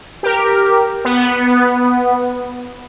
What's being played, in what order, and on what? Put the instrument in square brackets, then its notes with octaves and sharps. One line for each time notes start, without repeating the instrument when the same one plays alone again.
[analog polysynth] G4 A#4
B3